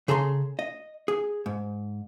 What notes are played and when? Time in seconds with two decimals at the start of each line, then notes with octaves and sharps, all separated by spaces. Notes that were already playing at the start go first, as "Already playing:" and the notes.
0.08 C#3 G#4 A4 A#5 C6
0.59 D#5
1.08 G#4
1.46 G#2